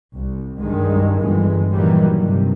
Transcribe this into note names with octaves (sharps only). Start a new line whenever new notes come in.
C2
G2 D#3 G#3
G1 E3 G#3
A#2 D#3 E3 F#3 G3
G2 C3